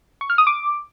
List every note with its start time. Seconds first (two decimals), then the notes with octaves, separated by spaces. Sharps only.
0.21 C#6
0.30 F6
0.38 D#6
0.47 D6